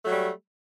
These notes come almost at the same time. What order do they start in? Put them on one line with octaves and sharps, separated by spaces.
A3 F#3 G3